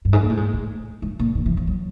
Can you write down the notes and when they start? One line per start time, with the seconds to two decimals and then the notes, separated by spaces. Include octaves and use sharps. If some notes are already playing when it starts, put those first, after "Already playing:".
0.05 G2
0.13 G#2
0.21 A#2
0.30 A2
0.37 G#2
0.53 A2
1.02 G#2
1.19 A#2
1.35 D#3
1.46 E3
1.57 F3
1.67 F#3